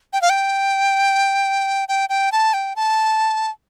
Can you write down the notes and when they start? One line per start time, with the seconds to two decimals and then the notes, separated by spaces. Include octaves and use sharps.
0.13 G5
0.21 F5
0.30 G5
1.89 G5
2.09 G5
2.32 A5
2.54 G5
2.76 A5